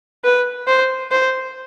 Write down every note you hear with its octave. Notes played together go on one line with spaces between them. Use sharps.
B4
C5
C5